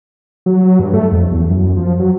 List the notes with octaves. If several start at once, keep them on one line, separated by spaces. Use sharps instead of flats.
F#3
G2
A3
F2
E2
F#2
F3
F#3